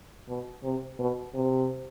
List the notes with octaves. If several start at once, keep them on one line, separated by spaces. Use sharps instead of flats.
B2
C3
B2
C3